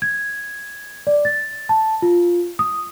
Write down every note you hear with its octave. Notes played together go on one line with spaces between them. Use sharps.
G#6
D5
A6
A5
F4
D#6